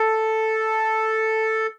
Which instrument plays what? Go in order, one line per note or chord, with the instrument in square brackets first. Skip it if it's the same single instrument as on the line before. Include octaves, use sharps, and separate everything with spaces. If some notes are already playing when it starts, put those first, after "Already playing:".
Already playing: [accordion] A4